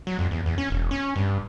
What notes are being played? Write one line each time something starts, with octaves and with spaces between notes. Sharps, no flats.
F#3
F2
E2
E2
C#4
E1
C#4
G2